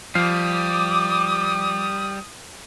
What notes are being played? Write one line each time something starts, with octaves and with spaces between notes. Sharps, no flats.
F3 G3 D6 D#6 F6 C7